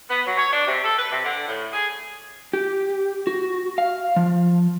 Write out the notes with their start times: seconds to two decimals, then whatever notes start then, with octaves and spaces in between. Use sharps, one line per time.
0.10 B3
0.25 F#3
0.37 C#5
0.52 D4
0.67 C3
0.84 A4
0.98 B4
1.11 C3
1.24 D3
1.47 A2
1.73 G#4
2.53 G4
3.27 F#4
3.78 F5
4.16 F3